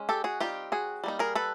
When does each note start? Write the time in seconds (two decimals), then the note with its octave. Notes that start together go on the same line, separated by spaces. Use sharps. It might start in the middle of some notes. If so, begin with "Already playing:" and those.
Already playing: G#3 C#4
0.09 G4 A4
0.24 F#4 G#4
0.40 G3 C4 D#4 F4 G4
0.72 F#4 G#4
1.04 G3 A#3 D#4
1.19 G#4 A#4
1.35 A4 B4